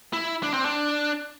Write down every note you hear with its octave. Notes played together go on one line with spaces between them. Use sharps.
E4
D4
C4
D4